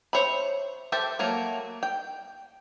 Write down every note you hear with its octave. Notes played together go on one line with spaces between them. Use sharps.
C5 C#5 E5 B5
G4 A4 C5 E5 G5
F#3 A3 A#3
G5